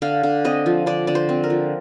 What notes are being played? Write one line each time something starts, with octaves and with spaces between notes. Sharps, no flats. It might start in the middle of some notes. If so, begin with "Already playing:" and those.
D3 F5
D3
C4 D#5
F3
D3 D5
D3 D5
C5
C4
A#4
F3